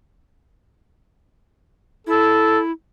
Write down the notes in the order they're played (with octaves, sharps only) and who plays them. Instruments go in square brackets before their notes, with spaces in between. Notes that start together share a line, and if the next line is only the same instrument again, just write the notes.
[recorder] E4 [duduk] A4